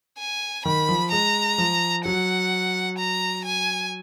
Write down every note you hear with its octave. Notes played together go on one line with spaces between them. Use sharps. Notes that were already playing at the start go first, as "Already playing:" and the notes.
G#5
D#3 B5
F3
G#3 A#5
F3
F#3 F#5
A#5
G#5